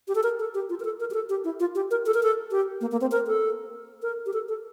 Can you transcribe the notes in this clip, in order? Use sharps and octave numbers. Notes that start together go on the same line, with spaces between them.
G4
A4
A#4
A4
G4
F4
A#4
A4
A#4
G4
A4
G4
E4
F4
G4
A#4
A4
A#4
A4
G4
A#3
A#3
C4
A#4
A4
A#4
G4
A4
A4